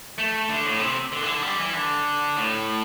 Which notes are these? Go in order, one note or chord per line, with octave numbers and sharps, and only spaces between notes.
A3
D3
A2
C3
D3
E3
D3
G3
E3
D3
A2